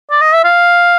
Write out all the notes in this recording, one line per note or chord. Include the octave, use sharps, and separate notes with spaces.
D5
D#5
E5
F5